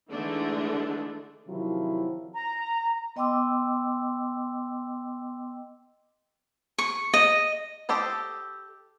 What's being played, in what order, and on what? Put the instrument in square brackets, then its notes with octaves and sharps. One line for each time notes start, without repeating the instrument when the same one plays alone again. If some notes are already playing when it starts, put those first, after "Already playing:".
[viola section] D3 E3 G#3 A3 D4 D#4
[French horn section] C3 D#3 F3 F#3 E4
[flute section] A#5
[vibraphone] B3 D#5 G5 C6 D6 E6
[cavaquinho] C#6
D#5
[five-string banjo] G4 A4 C5 D#5